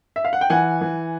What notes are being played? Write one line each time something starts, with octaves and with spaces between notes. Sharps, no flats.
E5
F5
F#5
G5
E3 F#5 G#5
E3